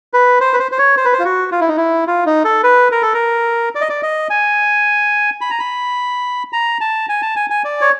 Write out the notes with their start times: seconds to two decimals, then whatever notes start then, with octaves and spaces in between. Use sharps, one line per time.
0.14 B4
0.41 C5
0.53 B4
0.60 C5
0.72 C5
0.78 C#5
0.97 C5
1.05 B4
1.13 C5
1.19 F4
1.25 F#4
1.52 F4
1.61 E4
1.68 D#4
1.77 E4
2.07 F4
2.26 D#4
2.45 A4
2.63 B4
2.92 A#4
3.02 A4
3.14 A#4
3.75 D5
3.81 D#5
3.89 D5
4.03 D#5
4.30 G#5
5.41 B5
5.50 A#5
5.59 B5
6.53 A#5
6.81 A5
7.09 G#5
7.22 A5
7.36 G#5
7.50 G#5
7.65 D5
7.81 C#5